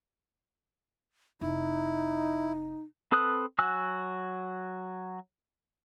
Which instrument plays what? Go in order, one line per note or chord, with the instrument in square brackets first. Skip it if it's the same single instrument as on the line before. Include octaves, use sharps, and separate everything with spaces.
[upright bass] F1 [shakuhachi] D#4 [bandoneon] E4
[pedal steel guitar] C4 A4 B4 D#6 F#6
F#3 F#4 G#5 E6 F#6